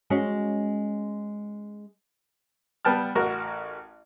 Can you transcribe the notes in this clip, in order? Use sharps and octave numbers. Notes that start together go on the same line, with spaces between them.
G#3 C#4 F#4
G3 B3 G5 A5 F6
A1 F#4 A#4